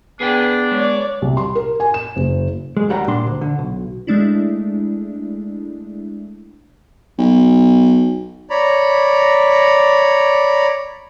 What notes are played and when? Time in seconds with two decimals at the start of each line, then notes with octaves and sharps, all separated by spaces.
0.20 B3 D4 G#4 B4 G5
0.72 G#3 C#5 D5
1.22 C2
1.37 C6
1.55 A#4
1.80 G#5
1.94 E7
2.16 F#1
2.77 G#3
2.89 D#2 G3 F#5 A#5
3.08 A#2 D4 C6
3.27 D2
3.41 D3
3.59 B1
4.07 G#3 A3 D4 E4
7.19 B1
8.50 C#5 D5 A#5 B5